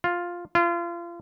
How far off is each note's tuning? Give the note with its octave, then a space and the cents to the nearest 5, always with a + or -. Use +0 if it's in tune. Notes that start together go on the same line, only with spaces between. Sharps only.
F4 +5
F4 -30